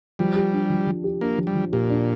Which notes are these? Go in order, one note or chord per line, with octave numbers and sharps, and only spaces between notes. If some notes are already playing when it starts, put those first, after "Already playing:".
F3 G3
G4
D4
F3
F3
G4
A#3 D4
F3
G3
F3
A#2 G4
D4